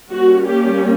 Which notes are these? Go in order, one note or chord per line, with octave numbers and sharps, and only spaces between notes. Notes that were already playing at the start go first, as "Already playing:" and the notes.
G3 A#3 C#4 F#4
G4